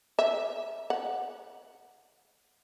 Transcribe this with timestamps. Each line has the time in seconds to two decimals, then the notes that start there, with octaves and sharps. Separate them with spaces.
0.19 E5
0.90 F#5